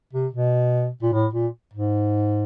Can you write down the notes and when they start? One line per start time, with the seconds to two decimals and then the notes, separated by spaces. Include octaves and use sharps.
0.13 C3
0.33 B2
1.03 A#2
1.13 A2
1.33 A#2
1.74 G#2